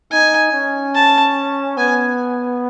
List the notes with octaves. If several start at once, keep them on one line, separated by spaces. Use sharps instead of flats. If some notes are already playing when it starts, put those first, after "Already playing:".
D#4 G#5
C#4
A5
B3 G#5